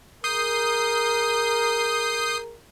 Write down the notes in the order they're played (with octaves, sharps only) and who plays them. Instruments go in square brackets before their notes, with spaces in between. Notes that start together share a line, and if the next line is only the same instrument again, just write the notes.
[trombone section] G#4 A#4 [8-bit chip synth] D#6 G6 C7